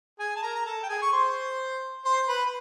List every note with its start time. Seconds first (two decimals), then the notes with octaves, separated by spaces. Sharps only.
0.19 G#4 G#5
0.36 A5
0.43 A#4 A#5
0.55 A#5
0.66 A4 A5
0.83 G5
0.89 G#4 G#5
1.02 C#6
1.12 C5 C6
2.05 C5 C6
2.28 B4 B5